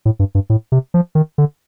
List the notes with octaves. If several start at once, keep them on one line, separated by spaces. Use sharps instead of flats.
A2
G2
G2
A2
C3
F3
D#3
D3